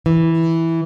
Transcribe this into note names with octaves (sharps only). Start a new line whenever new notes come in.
E3